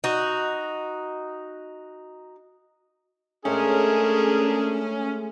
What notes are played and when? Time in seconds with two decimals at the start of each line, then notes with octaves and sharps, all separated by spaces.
0.04 D#4 F#4
3.45 A2 G#3 C#4 D4 G#4 A#4